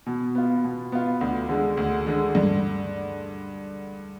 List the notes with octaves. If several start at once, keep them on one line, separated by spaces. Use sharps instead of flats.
B2
B3 F4
B2
B3 F4
D2
D3 G#3
D2
D3 G#3
G2